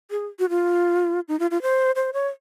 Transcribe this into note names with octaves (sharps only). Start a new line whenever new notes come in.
G#4
F#4
F4
D#4
F4
F4
C5
C5
C#5